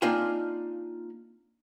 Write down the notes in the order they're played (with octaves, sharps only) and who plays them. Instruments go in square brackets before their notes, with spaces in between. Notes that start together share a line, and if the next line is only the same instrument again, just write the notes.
[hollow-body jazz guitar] A#3 C4 D4 D#4 F4 G#5